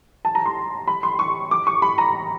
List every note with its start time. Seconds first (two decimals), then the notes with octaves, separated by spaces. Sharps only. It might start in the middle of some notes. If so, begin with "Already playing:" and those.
0.25 A5
0.35 A#5
0.46 C6
0.88 B5
1.03 C6
1.19 C#6
1.51 D6
1.67 C#6
1.82 B5
1.98 A#5